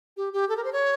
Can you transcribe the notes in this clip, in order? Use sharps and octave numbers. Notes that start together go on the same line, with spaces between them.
G4
G4
A4
A#4
C5
C#5